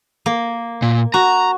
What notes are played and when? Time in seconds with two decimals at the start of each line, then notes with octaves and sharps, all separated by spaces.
0.26 A#3
0.82 A#2
1.14 F#4 A#5